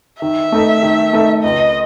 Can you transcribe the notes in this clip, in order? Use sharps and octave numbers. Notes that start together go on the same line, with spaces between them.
D#3 E5
A3 D#4 A4
D#3
A3 D#4 A4
C#2 D#5